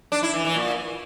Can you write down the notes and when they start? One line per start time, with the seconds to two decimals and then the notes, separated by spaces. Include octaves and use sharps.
0.12 D4
0.23 E4
0.34 E3
0.45 E3
0.56 A#2